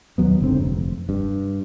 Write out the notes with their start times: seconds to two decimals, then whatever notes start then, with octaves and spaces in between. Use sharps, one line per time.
0.18 D#2 F#3 B3
0.40 F#1 G#2 D3 C4
0.61 F1
1.09 G2